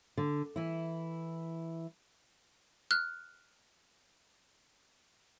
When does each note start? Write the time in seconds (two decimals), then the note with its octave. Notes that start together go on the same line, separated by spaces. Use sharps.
0.17 D3
0.56 E3 E4
2.91 F6 F#6